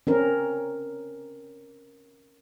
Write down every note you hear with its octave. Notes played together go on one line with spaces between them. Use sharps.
C4 C#4 A#4